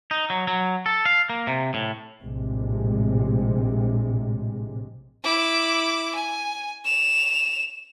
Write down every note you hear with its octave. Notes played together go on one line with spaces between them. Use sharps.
D#4
F#3
F#3
A4
F5
A#3
C3
A2
A#1 A2 C3 G#3
E4 D6
G#5
E7 F7